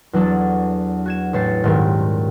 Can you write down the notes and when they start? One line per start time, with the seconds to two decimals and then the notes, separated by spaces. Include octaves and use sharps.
0.13 E2 F#3 D4 A4
1.06 F#4 G#6 E7
1.33 A1 A3 C#5 C#6 A6 C7
1.64 D#1 G#2 G4 A#4